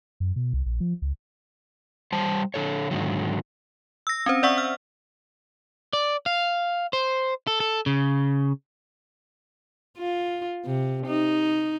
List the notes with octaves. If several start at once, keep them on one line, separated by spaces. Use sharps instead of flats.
F#2
B2
C2
A#1
F3
C#2
G3 C5 A5
D3 A4 C#5
G#2 D3 D#3 F#3
E6 A#6
C4 C#4 C5
D5 E5 F#5 C#6 E6
F6
D5
F5
C5
A4
A4
C#3
F4
C3
D#4